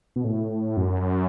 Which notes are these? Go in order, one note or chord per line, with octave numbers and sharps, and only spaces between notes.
B2
A2
F#2